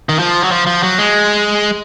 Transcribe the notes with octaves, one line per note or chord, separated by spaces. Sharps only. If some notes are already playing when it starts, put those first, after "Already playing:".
D#3
F3
F#3
F3
F3
F#3
G#3